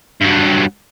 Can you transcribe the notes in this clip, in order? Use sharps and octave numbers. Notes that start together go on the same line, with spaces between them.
G2 F#3